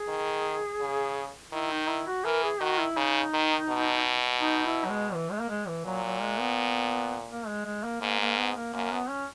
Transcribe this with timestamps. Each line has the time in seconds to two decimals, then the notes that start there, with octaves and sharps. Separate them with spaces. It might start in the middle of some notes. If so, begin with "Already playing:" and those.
Already playing: G#4
0.08 D#3
0.81 C#3
1.53 D#3 E4
1.71 D#4
1.89 E4
2.07 F#4
2.24 E3 A#4
2.43 G#4
2.60 D#3 F#4
2.79 E4
2.97 C#3 D#4
3.34 D#3
3.69 B2
4.41 D#4
4.66 E4
4.85 F#3
4.89 G#3
5.14 E3
5.32 G#3
5.41 A#3
5.50 G#3
5.68 E3
5.85 A#2 F#3
6.04 F#3
6.21 G#3
6.40 B3
7.30 A#3
7.48 G#3
7.66 G#3
7.84 A#3
8.02 G#2 A#3
8.20 A#3
8.37 B3
8.56 A#3
8.74 F#2 A#3
8.92 B3
9.10 C#4